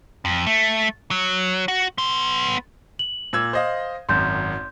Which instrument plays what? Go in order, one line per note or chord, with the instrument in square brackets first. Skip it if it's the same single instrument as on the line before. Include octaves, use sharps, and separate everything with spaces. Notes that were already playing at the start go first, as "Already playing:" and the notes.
[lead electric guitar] F2
A3
F#3
F#4
B3 C6
[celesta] F#7
[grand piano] A#2 E6 G#6
C5 D#5 F5
[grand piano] G#1 F#2 [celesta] C6 G6